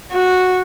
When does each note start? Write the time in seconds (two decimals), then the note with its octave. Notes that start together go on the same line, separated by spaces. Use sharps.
0.13 F#4